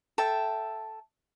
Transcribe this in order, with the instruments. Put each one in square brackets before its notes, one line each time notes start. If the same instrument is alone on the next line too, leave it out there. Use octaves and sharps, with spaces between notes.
[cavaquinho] A4 E5 G5